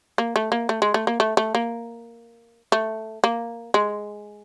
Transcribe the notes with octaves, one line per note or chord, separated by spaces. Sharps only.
A#3
A3
A#3
A3
G#3
A3
A#3
A3
A3
A#3
A3
A#3
G#3